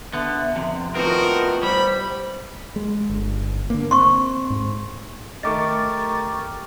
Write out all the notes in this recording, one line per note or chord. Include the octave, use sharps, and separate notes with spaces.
D3 B3 E5
F2 C3
A2 D#3 B3 C4 F4 F#4 A#4
G3 C5 B5
G#3
G1
D3 A#3
C4 C6 C#6
G#2
D#3 A3 D#4 G4 A#4 C#6 D6 A6